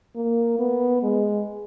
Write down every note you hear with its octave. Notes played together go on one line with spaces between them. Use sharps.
A#3
B3
G#3